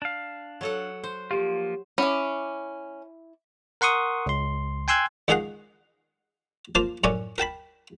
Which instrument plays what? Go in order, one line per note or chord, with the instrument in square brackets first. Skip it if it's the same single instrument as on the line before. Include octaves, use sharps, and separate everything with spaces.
[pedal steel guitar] D4 F5
[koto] F#3 A4 F#5
C5
[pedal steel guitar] F3 A#3 F4 [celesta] G4
[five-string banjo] C#4 [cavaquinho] E4 D6
[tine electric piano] A#4 F#5 C6 C#6 D#6
C#2 C6
G5 G#5 C6 E6 F#6 G#6
[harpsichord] C#2 D#3 D#4 G#4 F5 F#5
A#3 F4 C5 A5 D6
F#2 A2 C#4 C#5 D5 G#5
A#4 G5 A5 B5